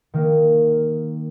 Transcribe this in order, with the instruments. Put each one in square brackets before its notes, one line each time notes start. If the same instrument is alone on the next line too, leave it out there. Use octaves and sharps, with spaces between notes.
[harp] D#3 A#3